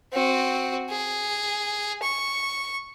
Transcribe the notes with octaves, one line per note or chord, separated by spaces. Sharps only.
C4 F#4
G#4
C#6